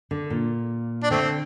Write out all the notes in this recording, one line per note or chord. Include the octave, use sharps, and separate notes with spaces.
D3
A#2
D4
D3 A3 C4